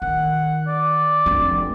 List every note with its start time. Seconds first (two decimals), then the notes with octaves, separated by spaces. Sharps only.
0.02 D#3 F#5
0.67 D5
1.26 F1 D4